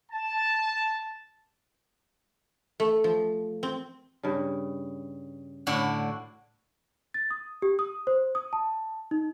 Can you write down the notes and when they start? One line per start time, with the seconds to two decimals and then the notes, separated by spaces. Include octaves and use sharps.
0.11 A5
2.80 A3
3.04 F3
3.63 C4
4.23 G2 C#3
5.67 A2 D3 F#4
7.14 A6
7.31 D#6
7.62 G4
7.79 D#6
8.07 C5
8.35 D#6
8.53 A5
9.11 D#4